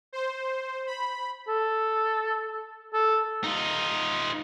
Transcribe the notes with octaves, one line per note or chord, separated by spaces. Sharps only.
C5
B5
A4
A4
D#4 F4